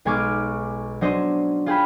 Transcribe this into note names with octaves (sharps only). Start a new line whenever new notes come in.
B1 G#3 G#5 C#6 D6 F6
F#3 C#4 D4 C5 D#5
F4 G#4 G5 B5